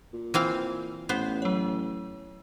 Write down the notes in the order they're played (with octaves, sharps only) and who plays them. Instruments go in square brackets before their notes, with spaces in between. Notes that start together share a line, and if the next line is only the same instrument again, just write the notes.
[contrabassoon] A#2
[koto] E3 C4 F5
[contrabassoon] A1 [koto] B3 C5
[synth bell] F#3 C#5